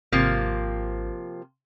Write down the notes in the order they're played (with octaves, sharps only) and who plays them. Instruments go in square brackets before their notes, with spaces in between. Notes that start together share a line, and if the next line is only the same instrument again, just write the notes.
[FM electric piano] G#1 [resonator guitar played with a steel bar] C3 F3 A#3